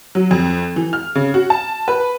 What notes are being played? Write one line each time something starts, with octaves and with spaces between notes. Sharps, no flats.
F#3
F2
E3
F6
C#3
F#4
A5
B4